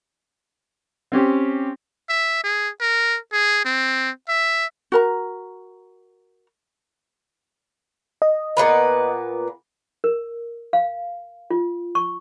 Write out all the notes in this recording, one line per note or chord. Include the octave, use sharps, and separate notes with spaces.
C4 C#4 G4
E5
G#4
A#4
G#4
C4
E5
F#4 A#4 A#5
D#5
A#2 B3 B4
A#4
F5
F4
C#6